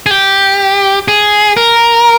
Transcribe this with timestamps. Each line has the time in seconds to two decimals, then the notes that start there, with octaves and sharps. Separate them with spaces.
0.06 G#4
0.11 G4
1.08 G#4
1.57 A#4